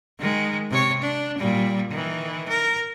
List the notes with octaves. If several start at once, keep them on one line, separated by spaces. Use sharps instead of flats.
D#3 G#3
C3 C#5
D4
A#2 G3
D#3 E3
A#4